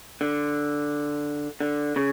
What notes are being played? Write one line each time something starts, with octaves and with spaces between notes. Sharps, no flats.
D3
D3
C#3